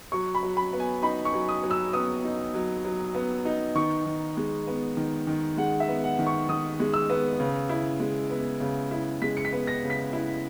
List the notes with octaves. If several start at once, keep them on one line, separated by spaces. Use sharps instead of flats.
F#3 C#6
B5
F#3
B5
B3
G#5
D#4 B5
C#6
F#3
D#6
F#3
E6
B3 D#6
D#4
F#3
F#3
B3
D#4
D#3 C#6
D#3
G#3
B3
D#3
D#3
G#3 F#5
E5
B3
F#5
D#3
C#6
D#3 D#6
G#3
E6
B3
C#3
E4
G#3
B3
C#3
E4
G#3 B6
C#7
B6
B3
A#6
C#3
B6
E4